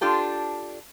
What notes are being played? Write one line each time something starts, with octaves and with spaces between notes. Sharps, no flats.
D4 F4 G4 A4